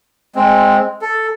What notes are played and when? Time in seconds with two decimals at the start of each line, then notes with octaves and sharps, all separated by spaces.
0.35 G#3 C4
1.01 A4